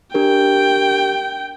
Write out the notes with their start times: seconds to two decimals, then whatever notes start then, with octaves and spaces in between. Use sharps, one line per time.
0.14 D4 G4 A#4 G5